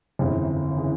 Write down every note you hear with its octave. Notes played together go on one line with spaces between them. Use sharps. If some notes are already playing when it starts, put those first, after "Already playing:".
G1 F2 C#3 E3
C#3 E3